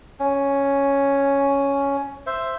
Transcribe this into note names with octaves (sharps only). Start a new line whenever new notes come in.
C#4
C5 E5